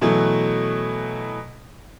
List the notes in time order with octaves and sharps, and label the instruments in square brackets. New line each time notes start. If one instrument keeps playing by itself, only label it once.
[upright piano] B2 E3 F#3 A3